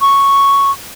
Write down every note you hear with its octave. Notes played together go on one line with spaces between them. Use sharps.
C#6